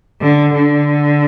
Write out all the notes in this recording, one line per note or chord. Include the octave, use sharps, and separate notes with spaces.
D3
D3